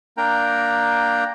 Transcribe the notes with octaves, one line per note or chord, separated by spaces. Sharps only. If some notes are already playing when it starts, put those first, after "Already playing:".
A#3 D4 A#4 G5 A#5